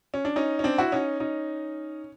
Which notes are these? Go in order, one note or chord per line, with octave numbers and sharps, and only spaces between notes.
C#4
D4
C#4 D#4
C#4
C4 D4
E4 F#4
C#4 D#4
C#4 D#4